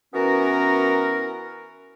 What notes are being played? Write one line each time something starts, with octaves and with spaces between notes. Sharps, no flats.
E3 B3 C#4 F#4 A#4